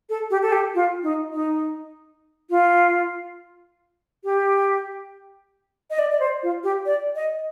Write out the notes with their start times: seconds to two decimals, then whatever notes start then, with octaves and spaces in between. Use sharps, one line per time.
0.09 A4
0.31 G4
0.42 A4
0.52 G4
0.75 F4
1.03 D#4
1.33 D#4
2.50 F4
4.24 G4
5.90 D#5
5.99 D5
6.12 D5
6.20 C5
6.43 F4
6.64 G4
6.86 D5
7.16 D#5